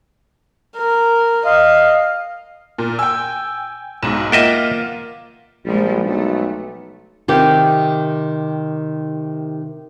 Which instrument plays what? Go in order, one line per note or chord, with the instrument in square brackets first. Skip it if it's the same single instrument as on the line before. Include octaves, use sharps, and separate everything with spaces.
[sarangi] A#4
[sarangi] D#5 [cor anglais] F5
[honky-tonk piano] A#2
[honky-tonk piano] G5 G#5 [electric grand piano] E6
[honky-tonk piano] B1 G#2 [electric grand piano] E7
[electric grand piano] A#3 F#5 A6 [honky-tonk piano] F4 [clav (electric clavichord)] D#5 E5 G5
[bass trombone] A#1 [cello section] F3 G3 G#3
[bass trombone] B1 [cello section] A3
[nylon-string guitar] C3 D#3 G4